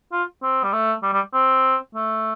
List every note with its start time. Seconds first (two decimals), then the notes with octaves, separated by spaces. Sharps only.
0.12 F4
0.42 C4
0.63 G3
0.72 A3
1.03 G3
1.13 G3
1.33 C4
1.95 A3